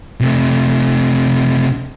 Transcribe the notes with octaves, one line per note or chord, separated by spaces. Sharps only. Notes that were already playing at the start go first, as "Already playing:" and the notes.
C3 A3